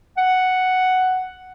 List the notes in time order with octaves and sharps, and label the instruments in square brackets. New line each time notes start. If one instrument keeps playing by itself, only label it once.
[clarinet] F#5